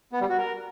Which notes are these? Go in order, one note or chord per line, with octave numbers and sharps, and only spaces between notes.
B3
G3
F#4
A#4